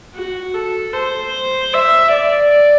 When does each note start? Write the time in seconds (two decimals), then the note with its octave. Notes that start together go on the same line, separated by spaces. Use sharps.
0.15 F#4
0.54 A4
0.94 C5
1.73 E5
2.13 D5